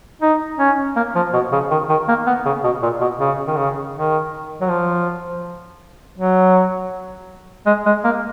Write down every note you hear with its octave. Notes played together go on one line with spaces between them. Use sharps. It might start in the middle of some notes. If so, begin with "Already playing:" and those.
D#4
C#4
A#3
F3
B2
C#3
D#3
D#3
A#3
B3
C#3
B2
A#2
B2
C#3
D#3
C#3
D#3
F#3
F3
F#3
G#3
G#3
A#3